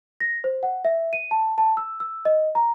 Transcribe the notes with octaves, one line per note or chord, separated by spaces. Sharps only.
A#6
C5
F#5
E5
D#7
A5
A5
E6
E6
D#5
A#5